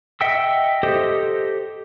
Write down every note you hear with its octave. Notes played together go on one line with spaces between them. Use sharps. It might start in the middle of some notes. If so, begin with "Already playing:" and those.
D#5 E5 F#5 G5 E6
G4 A4 C5 D#5